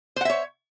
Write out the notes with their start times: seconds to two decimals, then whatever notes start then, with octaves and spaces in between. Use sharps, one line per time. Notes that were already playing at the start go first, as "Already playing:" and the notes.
0.16 C5
0.21 F#5
0.25 E5
0.30 C#5